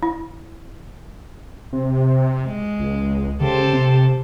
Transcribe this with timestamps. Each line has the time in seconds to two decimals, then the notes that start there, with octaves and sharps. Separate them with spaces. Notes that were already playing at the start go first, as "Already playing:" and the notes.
0.03 E4
1.73 C3
2.45 G#3
2.80 C#2
3.41 C#3 G4 A4 C5
3.73 C3